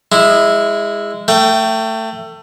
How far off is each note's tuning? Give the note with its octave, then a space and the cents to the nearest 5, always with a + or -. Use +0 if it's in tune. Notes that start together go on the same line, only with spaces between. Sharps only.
G#3 -15 E4 +5
A3 +25 G5 -20